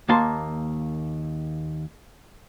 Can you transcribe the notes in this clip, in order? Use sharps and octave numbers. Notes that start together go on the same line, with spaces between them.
D#2 A#3 A5 C6